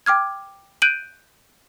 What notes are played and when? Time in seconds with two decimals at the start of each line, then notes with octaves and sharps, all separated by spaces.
0.06 G5 D6 F6 G#6
0.82 F#6 G6 D7 D#7 F#7